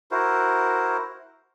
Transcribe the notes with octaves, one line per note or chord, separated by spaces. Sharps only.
E4 F#4 A#4 C5